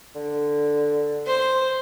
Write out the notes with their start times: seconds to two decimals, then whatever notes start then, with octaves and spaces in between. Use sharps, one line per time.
0.15 D3
1.26 C5